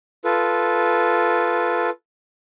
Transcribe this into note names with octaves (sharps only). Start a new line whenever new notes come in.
F4 A4 B4